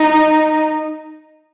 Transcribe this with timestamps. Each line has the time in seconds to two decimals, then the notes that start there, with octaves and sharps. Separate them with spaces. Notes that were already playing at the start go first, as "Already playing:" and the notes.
Already playing: D#4